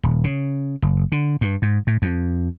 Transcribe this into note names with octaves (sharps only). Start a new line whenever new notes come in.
D#1
C#3
F#1
D3
G2
G#2
A2
F2